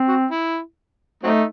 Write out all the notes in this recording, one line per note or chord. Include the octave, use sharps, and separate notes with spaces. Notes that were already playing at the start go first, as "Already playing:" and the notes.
Already playing: C4
F#4
E4
F#3 A3 C4 D#4